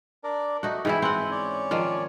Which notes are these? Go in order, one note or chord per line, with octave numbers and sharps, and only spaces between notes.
D4 A#4 D5
A3 D#4 F#4
G#2 E3 E4 G5 G#5 B5
C4 F#5 G#5
C#4 C#5 D5
D#3 F3 F4